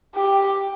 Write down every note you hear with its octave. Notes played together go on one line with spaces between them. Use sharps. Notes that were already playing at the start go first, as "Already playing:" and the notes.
G4